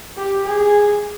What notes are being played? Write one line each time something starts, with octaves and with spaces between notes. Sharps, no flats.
G4
G#4